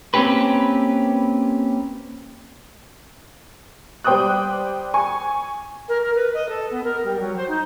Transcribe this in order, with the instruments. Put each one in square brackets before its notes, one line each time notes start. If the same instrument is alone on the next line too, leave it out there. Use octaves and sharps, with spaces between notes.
[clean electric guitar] A#3 C4 C#4 G4 B4
[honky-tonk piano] G3 C5 G5 D6 D#6 F#6
G#5 C#6
[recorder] A#4
A#4
B4
D#5
A4
B3
A#4
G3
F#3
C5
D#4